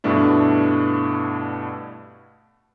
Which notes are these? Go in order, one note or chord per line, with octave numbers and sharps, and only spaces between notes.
G2 B2 A3 D4 E4